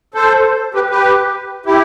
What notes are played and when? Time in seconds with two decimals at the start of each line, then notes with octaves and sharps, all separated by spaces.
0.14 A4 C5
0.74 G4 B4
0.90 G4 B4
1.66 E4 G4